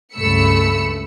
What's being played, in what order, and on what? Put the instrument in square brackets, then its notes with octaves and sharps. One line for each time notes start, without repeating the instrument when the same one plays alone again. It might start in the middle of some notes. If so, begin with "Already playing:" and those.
[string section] C#2 G2 A3 B5 E6 C#7